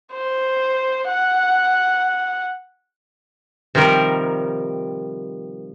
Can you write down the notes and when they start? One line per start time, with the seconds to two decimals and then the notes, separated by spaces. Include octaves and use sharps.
0.13 C5
1.08 F#5
3.75 C3 D#3 F3 G3 A#4